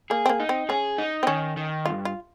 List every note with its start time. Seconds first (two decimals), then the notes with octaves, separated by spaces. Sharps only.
0.10 A#3 G#4
0.26 C4
0.29 A#3
0.40 D#4
0.49 C4
0.69 C#4 G#4
0.98 D#4
1.23 C4
1.27 D#3 C#4
1.57 D#3
1.85 G2 F4
2.05 F4